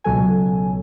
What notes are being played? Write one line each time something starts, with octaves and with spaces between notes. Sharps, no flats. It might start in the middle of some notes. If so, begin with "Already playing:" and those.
C#2 B2 F#3 A4 G#5